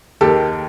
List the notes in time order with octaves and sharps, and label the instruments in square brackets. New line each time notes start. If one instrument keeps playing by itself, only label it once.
[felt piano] D#2 D#3 G4 A4